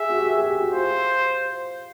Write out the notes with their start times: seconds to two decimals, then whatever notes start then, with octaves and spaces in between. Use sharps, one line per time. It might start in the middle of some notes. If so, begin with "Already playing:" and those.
Already playing: G#4 E5
0.10 F#4
0.17 G4
0.25 G#4
0.37 G#4
0.48 G4
0.60 F#4
0.72 F4 C5